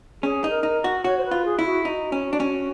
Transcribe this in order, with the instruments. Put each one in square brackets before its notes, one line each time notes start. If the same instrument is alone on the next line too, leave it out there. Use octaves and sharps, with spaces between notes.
[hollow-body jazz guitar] C#4 [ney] G#4
[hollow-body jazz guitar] D#4
[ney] A#4
[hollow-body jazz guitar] D#4
F#4
[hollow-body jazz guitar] F#4 [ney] C#5
[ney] C5
B4
[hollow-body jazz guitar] F4
[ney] G#4
[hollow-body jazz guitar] E4 [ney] F4
[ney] F#4
[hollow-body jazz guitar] D#4 [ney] F#4
[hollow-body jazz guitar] C#4
D4
C#4